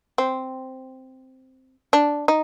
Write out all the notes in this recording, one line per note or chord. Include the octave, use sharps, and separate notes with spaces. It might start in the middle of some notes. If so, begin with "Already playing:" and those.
C4
D4
D#4